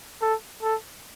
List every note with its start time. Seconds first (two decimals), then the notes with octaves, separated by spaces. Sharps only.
0.22 A4
0.63 A4